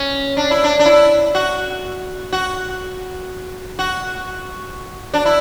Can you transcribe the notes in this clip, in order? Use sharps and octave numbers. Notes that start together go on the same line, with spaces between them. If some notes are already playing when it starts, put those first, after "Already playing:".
Already playing: C#4
D4
E4
D4
D4
E4
F#4
F#4
F#4
D4
E4